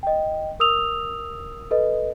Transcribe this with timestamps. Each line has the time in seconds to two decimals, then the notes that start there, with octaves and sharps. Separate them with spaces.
0.03 D#5 G5
0.60 A#4 D#6 E6 F7
1.71 A4 B4 D#5